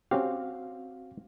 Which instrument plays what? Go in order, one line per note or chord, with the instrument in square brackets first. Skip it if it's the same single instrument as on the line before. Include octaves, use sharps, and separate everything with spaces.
[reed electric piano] C4 F#4 F5 [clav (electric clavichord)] C#4 G4